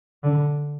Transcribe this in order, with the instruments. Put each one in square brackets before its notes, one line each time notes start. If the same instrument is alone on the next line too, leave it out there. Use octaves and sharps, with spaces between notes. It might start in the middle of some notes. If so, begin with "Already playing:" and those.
[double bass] D3